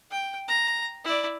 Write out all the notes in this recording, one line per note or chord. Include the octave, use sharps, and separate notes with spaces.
G5
A#5
E4 D5